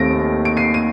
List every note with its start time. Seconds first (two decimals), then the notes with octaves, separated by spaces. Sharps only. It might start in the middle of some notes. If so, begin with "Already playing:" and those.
Already playing: D#2 D#3 A3 C4 A#6 D7
0.45 D7
0.57 C7 D#7
0.74 D#7